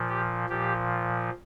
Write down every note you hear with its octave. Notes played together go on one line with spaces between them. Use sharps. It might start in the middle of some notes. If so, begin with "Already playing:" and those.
Already playing: A#2 F3
G4
A#2 F3 G4